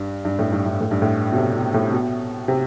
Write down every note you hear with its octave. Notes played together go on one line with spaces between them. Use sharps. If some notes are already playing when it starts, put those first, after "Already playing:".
Already playing: G2
G2
A2
G2
G2
A2
G2
A2
B2
C3
B2
A2
B2
C3